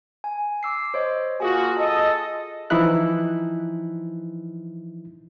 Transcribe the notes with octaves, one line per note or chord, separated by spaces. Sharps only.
G#5
D6 E6 C7
C5 C#5 D#5
A#3 F4 F#4 G#4 G#5
A4 D#5
E3 F3 D#4 E4 F#6